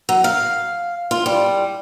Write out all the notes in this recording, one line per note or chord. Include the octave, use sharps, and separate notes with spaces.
F#3
F5
F4
G3